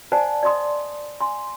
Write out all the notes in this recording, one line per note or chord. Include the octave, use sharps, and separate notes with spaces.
C5 D5 F#5 G#5 A5
D5 D#5 C6 D#6
G#5 C6